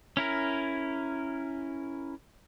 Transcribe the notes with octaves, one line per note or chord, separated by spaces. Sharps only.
C#4 E4 A#4